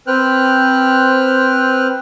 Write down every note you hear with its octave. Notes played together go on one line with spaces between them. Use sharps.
C4 B4 C5 G5 F6 F#6